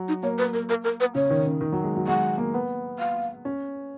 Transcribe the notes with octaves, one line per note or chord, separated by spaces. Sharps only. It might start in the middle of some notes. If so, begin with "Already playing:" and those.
Already playing: F#3
D#4
A#3 C#5
B4
A#4
A#4
A#4
B4
C#3 C#5
D#3
C#3
D#3
F#3
G#3
F#3
G#3 F#5
A#3
B3
F5
C#4